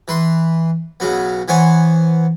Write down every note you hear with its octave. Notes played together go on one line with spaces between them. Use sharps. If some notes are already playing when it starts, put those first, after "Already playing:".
E3 B4 C6
B1 C#3 F#3 B3
E3 B3 C5 C#5 G#5